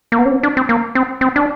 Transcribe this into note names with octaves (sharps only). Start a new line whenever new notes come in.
A#3
B3
C#4
C4
D4
C4
A#3
C4
C4
D4